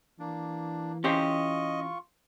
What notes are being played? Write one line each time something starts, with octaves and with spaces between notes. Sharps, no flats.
E3 A#3 D4
C#4 F4 G4 C5 D#5 C#6